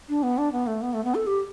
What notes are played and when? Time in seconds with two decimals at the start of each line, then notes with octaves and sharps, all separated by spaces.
0.09 D4
0.23 B3
0.38 D4
0.52 B3
0.67 A3
0.82 B3
0.94 A3
1.05 B3
1.15 A4
1.27 G4